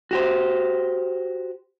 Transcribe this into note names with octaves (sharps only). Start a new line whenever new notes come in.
F#4 G4 C5